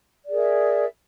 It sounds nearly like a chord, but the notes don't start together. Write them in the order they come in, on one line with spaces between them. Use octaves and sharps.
D5 G#4 A#4 E5